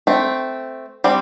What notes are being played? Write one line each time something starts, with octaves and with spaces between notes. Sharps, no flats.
A3 C4
G3 C4